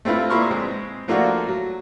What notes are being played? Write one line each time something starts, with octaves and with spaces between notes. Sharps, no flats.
A3 C4 E4 F4 B4
A#2 E4 B4 C6 C#6 F6
G#3 C4
F3 A3 A#3 D4 F4 F#4
F#3